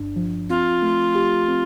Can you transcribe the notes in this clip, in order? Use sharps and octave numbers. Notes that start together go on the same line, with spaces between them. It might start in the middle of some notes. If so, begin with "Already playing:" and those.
Already playing: G1 G2 D4
F3
C4 F4
A3
G4
C4